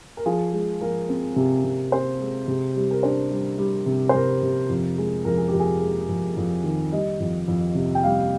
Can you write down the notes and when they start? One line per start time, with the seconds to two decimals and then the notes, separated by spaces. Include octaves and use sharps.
0.17 A#4
0.26 F3 G#4
0.53 G#3
0.81 F3 A#4
1.09 C4
1.36 C3
1.64 C3
1.92 C4 C5
2.20 G#3
2.48 C3
2.76 G3
2.91 A#4
3.03 D4 C5
3.31 G3
3.58 G3
3.86 C3
4.09 C5
4.15 C3 A#4
4.43 C3
4.69 F2
4.98 G#3
5.25 F2 A#4
5.37 G#4
5.48 F2 G4
5.59 G#4
5.81 G#3
6.09 F2
6.37 F2
6.64 D#3
6.92 G3 D#5
7.20 F2
7.48 F2
7.75 C3
7.95 G5
8.03 G3 F5